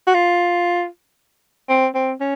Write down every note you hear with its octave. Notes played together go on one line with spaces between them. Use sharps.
F#4
F4
C4
C4
C#4